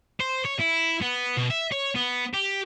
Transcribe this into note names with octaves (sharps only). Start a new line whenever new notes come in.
C5
C#5
E4
B3
B2
E5
C#5
B3
G4